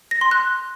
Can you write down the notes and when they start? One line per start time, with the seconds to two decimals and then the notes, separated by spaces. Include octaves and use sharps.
0.11 A#6
0.21 C6
0.31 F#6